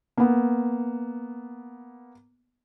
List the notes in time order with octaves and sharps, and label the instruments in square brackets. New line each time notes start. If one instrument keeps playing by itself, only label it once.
[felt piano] A#3 B3